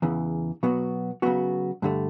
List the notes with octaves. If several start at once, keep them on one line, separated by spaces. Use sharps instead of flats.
E2 C#3 E3
B2 F#3 B3 F#4
C#3 F#3 B3 F#4
G2 D3 A3